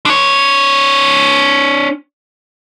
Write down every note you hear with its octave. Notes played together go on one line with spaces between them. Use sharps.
D4 C#5